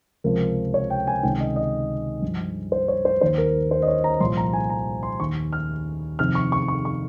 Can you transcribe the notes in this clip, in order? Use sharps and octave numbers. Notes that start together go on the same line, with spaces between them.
C#2 C3 F3 A#4
C#5
G5
G#5
C#2 C3 D#3 G5
D#5
D#5
G2 F3
C5
C#5
C5
D#2 D#3 C5
A#4
C5
D#5
C#5
A#5
C2 A#2 F3 C6
A#5
G#5
A#5
C6
D#2 D#3 C#6
F6
F2 C3 D#3 F6
C#6
C#6
C#6
C#6